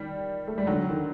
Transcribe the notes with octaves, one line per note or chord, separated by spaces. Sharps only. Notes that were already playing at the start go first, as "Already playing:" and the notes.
Already playing: D#3 G3
A3
G3
D3 F#3
D#3